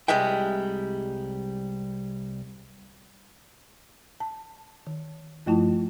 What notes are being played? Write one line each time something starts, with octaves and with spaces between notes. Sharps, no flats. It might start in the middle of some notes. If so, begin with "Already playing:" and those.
C2 G3 G#3 E5 G5
A5
D#3
G2 F3 A3 E4 F4 A5